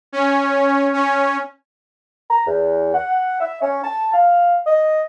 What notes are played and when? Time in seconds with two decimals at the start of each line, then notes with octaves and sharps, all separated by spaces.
0.12 C#4
0.94 C#4
2.31 A#5
2.47 E2
2.95 F#5
3.41 E5
3.62 C#4
3.84 A5
4.14 F5
4.67 D#5